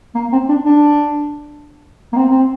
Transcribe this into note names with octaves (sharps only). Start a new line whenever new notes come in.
A#3
C4
D4
D4
A#3
C4
C4